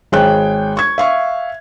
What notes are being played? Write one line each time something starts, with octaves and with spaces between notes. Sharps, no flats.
G#1 G#4 C#5 G5 F#6
C#6 G#6
E5 F5 C#6